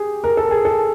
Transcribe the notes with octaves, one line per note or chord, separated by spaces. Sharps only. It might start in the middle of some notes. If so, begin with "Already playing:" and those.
Already playing: G4 G#4
A#4
A4
G#4
A4